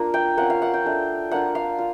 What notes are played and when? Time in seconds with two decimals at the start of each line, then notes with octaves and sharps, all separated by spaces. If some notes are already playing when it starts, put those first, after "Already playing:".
Already playing: A#3 D4 F4
0.14 G5
0.37 A#3 C#4 F4 F#5
0.50 F5
0.62 F#5
0.74 G5
0.85 A3 D4 F4
1.31 A#3 D4 F4 F#5
1.55 F5
1.79 F4